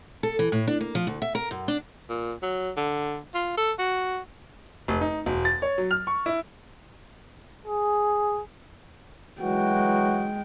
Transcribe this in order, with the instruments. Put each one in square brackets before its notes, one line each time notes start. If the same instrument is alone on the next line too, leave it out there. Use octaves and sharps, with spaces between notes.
[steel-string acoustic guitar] A4
E3
A2
D4
A#3
F3
D2
E5
A#4
F#2
D4
[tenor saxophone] A#2
F#3
D3
F4
A4
F#4
[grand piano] F1
D#4
E1
A6
C#5
F#3
F6
C#6
E4
[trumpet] G#4
[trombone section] E3 F#3 F#4 [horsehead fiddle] G#3 G5